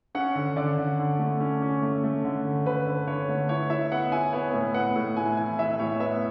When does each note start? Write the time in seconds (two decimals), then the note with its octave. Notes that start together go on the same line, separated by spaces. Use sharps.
0.15 C#4 F#5
0.35 D3
0.56 D3 D5
0.78 D3
0.99 D3
1.19 A3
1.40 C#4
1.62 C#4
1.82 A3
2.04 A3
2.24 D3
2.45 D3
2.66 D3 B4
2.87 D3
3.07 D3 C#5
3.29 A3
3.49 E4 C#5
3.70 E4 E5
3.92 B3 F#5
4.12 E4 G#5
4.33 B3 C#5
4.54 A2
4.74 B3 F#5
4.96 A2
5.17 E4 G#5
5.37 E3 G#5
5.59 E3 E5
5.80 A2 C#5
6.00 B3 E5